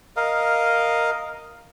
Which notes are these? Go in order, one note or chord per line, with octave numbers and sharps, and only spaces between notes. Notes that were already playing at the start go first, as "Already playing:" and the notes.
A#4 D#5 F5